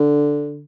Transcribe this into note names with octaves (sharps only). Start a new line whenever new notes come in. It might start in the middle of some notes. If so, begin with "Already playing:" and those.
Already playing: D3